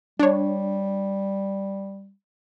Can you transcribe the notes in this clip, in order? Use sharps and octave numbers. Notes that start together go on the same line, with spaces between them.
G3 D4 C#5